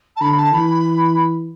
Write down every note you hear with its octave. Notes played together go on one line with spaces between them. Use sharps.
A5
D3 B5
A5
E3 B5